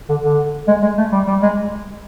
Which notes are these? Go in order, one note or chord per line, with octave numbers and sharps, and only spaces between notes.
D3
D3
G#3
G#3
A3
G3
G3
G#3